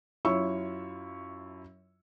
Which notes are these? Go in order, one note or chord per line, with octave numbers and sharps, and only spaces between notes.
F#2 E4 F4 C#5 C#6 E6